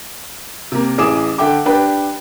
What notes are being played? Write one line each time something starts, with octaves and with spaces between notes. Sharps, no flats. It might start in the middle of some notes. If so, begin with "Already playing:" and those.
C3 A#3
A1 E3 G#4 D6 D#6 E7
D3 A4 E5 G5 D6
D4 G4 B4 G5